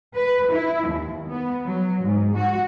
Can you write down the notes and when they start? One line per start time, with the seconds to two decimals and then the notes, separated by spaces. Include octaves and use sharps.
0.15 B4
0.52 E4
0.88 D#2
1.30 B3
1.66 F#3
2.04 G#2
2.36 F#4